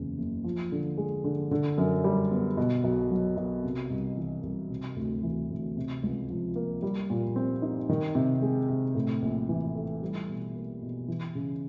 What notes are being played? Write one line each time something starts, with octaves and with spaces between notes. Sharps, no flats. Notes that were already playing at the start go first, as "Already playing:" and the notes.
Already playing: F#1 E2 C#3
F#1
F3
D3
G#3
D3
D3
F#2
G3
B3
B2
B1
F#3
B1
C3
C2
E3
C2
C3
D2
E3
D2
C3
C#2
F3
A#3
G3
A#2
C4
D#4
D#3
C3
G#3
C3
A2
A#1
E3
A3
G3
B2
A#3
B2
E3
C#3